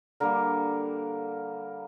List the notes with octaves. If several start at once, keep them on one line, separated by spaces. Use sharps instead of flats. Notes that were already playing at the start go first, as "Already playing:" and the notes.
D3 G3 A#3 A#4